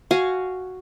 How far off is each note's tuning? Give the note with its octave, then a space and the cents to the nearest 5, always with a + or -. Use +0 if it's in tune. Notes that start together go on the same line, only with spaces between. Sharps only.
F#4 +0 F5 -10 G#5 +0